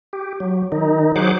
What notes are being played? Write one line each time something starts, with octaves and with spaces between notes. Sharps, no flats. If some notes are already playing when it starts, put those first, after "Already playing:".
G4
F#3
D#3 D#4
F#3 G#4 C5 F#5 D6